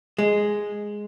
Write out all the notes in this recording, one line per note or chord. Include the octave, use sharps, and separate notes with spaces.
G#3